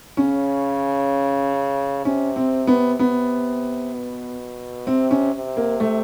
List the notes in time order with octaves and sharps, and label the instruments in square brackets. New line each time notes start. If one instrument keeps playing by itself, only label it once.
[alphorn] C#3 [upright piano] C#4
[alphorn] C3 [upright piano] C#4
[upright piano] C4
B3
[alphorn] C3 [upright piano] B3
[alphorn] B2
[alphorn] C3 [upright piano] C4
[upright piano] C#4
[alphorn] C3
[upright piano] A#3
A3